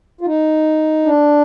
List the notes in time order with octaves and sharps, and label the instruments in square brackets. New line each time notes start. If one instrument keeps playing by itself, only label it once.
[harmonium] F4
D#4
D4